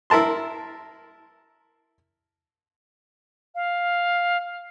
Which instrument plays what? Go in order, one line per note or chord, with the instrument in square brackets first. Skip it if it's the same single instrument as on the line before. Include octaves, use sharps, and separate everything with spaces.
[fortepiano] E4 A#4 A5 C6
[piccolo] F5